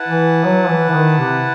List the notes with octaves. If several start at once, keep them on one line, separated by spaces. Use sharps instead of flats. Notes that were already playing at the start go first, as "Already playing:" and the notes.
Already playing: E4 B4 F#5 A5
E3
F#3
E3
E3
D#3
C3